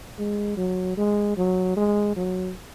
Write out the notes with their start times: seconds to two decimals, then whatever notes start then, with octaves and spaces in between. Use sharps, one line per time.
0.18 G#3
0.57 F#3
0.97 G#3
1.37 F#3
1.77 G#3
2.16 F#3